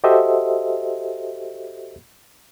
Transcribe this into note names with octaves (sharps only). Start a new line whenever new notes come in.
F#4 G4 A4 C5 D#5 E5